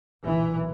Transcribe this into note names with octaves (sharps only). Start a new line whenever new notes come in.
B1 A#2 E3